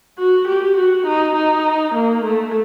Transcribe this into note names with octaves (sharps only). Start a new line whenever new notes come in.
F#4
G4
F#4
D#4
D#4
A#3
A3